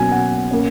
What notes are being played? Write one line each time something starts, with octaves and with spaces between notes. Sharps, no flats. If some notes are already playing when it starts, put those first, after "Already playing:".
Already playing: B2 F#3 A#3 C#4 G#5
F#5
A#3 C#4